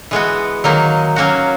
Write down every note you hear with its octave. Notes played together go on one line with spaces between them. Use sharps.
E3 G#3 B3 F#4
D#3 F#3 A#3 D#4
F#3 A#3 C#4 F#4